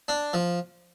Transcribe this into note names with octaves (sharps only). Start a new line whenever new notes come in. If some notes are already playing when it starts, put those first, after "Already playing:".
D4
F3